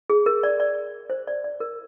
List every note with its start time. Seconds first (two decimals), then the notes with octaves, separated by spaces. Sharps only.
0.10 G#4
0.26 A#4
0.43 D5
0.60 D5
1.10 C5
1.27 D5
1.44 D5
1.60 A#4